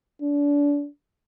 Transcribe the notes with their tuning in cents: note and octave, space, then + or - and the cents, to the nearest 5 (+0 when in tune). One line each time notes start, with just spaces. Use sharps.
D4 -30